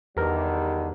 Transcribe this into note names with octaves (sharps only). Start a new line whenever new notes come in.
E2 D3 D#3 G3 G4 A#4 B4